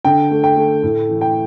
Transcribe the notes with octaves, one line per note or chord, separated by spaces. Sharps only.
D3 G5
A3
G5
A3
A2
E3
G5